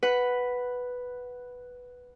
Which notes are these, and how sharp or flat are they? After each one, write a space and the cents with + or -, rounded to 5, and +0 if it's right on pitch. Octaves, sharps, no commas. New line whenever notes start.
B4 +0 F#5 +0